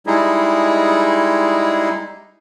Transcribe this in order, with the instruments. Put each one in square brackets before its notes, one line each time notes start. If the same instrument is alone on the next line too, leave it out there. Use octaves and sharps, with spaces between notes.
[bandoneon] G3 G#3 D#4 E4 G#4